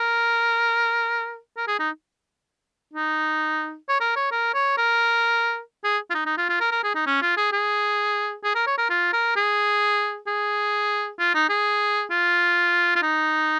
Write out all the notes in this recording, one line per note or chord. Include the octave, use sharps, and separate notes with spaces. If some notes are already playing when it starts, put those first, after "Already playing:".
Already playing: A#4
A#4
G#4
D#4
D#4
C#5
A#4
C#5
A#4
C#5
A#4
G#4
F4
D#4
D#4
F4
F4
A#4
A#4
G#4
D#4
C#4
F4
G#4
G#4
G#4
A#4
C#5
A#4
F4
A#4
G#4
G#4
F4
D#4
G#4
F4
F4
D#4